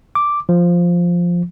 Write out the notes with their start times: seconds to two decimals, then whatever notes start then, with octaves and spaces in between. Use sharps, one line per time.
0.15 D6
0.49 F3